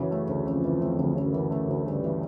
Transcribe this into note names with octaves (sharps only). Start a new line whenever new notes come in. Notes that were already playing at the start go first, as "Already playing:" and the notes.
Already playing: F#2 C#3 E3
A3
D2
F2 C#3
E3
A3
D2
F#2 C#3
E3
A3
D2
G2 C#3
E3